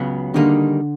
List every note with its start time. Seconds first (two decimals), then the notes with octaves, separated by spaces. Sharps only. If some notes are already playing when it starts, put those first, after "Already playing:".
Already playing: C#2 C#3 F#3 B3
0.34 D3 D#3 G3 A#3 D#4 G#4